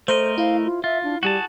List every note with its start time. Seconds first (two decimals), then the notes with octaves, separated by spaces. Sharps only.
0.08 A3 A4 A#4 C5 D#5
0.38 E4 F5
0.65 F4
0.84 F4 E5
1.04 D4
1.23 G3 F#4 G#4 A5